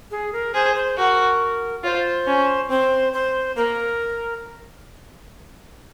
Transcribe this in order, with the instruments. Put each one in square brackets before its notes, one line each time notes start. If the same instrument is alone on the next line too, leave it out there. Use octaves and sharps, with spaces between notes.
[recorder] G#4
A#4
[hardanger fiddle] G#4 [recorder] C5
[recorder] C5
[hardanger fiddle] F#4 [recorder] A#4
[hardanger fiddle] F4 [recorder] C5 C#5
[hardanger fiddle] C#4
[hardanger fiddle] C4 [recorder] C5
[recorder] C5
[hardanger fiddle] A#3 [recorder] A#4